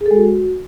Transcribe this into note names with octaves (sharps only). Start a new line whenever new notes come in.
G#4
A4
G#3
F#4